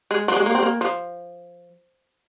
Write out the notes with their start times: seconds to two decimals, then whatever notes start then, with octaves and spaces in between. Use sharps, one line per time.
0.11 G#3
0.28 F3
0.36 G#3
0.46 A#3
0.55 C4
0.62 A#3
0.81 F3